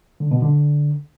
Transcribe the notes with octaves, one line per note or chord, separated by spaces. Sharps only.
D3
B2
D3